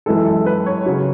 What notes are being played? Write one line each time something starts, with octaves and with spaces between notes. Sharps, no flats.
F#2 E3 G#3 A4
A4
B4
C#5
C#3 F#3 C#5